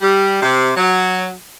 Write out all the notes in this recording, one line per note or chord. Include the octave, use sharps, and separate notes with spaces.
G3
C3
F#3